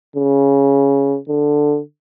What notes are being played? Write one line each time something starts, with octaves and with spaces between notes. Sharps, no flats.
C#3
D3